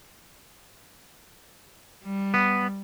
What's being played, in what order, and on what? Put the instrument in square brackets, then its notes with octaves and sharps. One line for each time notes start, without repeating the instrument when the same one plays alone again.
[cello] G3
[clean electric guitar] B3